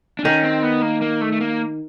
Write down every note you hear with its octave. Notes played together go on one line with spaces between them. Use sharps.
D4
D#3 C#4
C4
B3
A#3
A#3
A3
A3
A#3